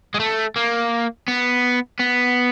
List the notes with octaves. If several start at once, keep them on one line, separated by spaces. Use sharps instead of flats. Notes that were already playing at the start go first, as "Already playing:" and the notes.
G#3
A3
A#3
B3
B3